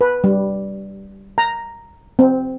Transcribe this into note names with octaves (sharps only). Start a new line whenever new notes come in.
B4
G3
A#5
C4